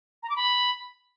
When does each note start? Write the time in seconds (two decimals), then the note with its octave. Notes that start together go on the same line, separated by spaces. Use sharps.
0.23 A#5
0.30 D6
0.36 B5